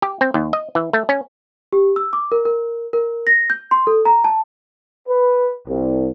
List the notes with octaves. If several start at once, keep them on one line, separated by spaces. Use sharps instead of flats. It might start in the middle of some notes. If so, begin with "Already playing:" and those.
G4
C4
D#2
D#5
E3
A3
C#4
G4
E6
D6
A#4
A#4
A#4
A#6
G6
C6
A4
A#5
A5
B4
C2